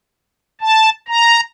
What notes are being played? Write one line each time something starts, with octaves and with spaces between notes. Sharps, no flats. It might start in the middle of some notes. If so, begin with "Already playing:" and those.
A5
A#5